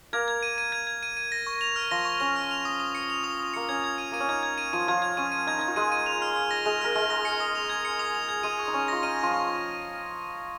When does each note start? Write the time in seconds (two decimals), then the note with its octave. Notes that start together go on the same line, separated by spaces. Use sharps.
0.13 A#3 A#4 G#6
0.28 G#6
0.43 D#7
0.58 D#7
0.72 G#6
0.87 G#6
1.03 D#7
1.17 D#7
1.32 A#6
1.47 C#6
1.61 F7
1.76 F6
1.91 F3 F4 A#6
2.05 C#6
2.20 C#4 F7
2.36 F6
2.51 F7
2.65 D#6
2.80 D#6
2.95 C#7
3.10 F7
3.24 D#6
3.39 D#6
3.54 A#3 C#7
3.69 C#4 G#6
3.84 G#6
3.98 D#7
4.12 A#3 D#7
4.20 C#4
4.28 D#4 G#6
4.43 G#6
4.58 D#7
4.73 F3 F4 D#7
4.88 F3 F4 G#6
5.02 G#6
5.17 C#4 D#7
5.32 D#7
5.47 D#4 G#6
5.59 D#4 G#6
5.68 F4
5.76 G#3 G#4 D#7
5.92 D#7
6.06 F7
6.22 F6
6.36 F6
6.51 A#6
6.66 G#3 G#4 F7
6.81 A#4 F6
6.95 G#3 G#4 F6
7.10 A#6
7.25 C#7
7.40 D#6
7.55 F7
7.69 G#6
7.85 C#7
7.99 D#6
8.15 F7
8.29 G#6
8.43 G#3 G#4 D#7
8.59 C#6
8.68 D#4
8.74 C#4 C#6
8.88 F4 A#6
9.03 D#4 D#7
9.19 F3 F4 C#6
9.34 C#6